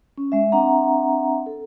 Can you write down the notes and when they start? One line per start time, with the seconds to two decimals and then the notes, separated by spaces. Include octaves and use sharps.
0.18 C#4
0.32 G#3 E5
0.52 C4 D4 E5 F#5 A#5
1.46 A4